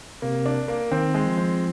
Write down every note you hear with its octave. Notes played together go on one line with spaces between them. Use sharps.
C3 A#3
D4
A#3
D#3 C4
G#3
F3
C4